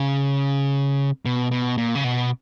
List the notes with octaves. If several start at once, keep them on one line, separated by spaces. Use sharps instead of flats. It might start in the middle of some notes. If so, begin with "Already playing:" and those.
Already playing: C#3
B2
B2
A#2
C#3
B2